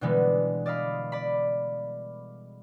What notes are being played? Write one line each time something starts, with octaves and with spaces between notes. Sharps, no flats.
B2 D3 E3 G3 G#3 B3
D5 D#5 F5 B5
D5 B5